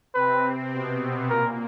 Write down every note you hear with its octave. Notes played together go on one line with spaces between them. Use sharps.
C3 C4 B4
B2 B3
A#2 A#3 A#4